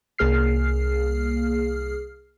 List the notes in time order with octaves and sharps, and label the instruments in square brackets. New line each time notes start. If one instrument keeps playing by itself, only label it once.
[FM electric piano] C2 A#3 G#4 F6 C7